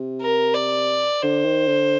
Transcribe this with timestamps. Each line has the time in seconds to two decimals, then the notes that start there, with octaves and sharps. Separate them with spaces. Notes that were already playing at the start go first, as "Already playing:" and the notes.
Already playing: C3
0.21 A#4
0.54 D5
1.22 D3 C5
1.45 D#3
1.68 D3